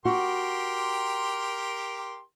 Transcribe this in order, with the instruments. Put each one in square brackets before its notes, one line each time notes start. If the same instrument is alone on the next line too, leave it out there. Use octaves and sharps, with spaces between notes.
[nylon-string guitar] F#4 [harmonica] G4 A#4 C6